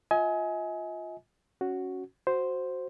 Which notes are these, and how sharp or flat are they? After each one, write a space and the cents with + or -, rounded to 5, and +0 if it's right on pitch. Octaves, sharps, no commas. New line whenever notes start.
F4 +10 D#5 +40 G#5 +15
C#4 +0 F#4 +0
F#4 +0 C5 +0